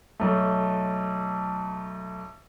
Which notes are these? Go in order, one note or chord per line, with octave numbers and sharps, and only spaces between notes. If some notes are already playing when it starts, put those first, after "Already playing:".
B1 A3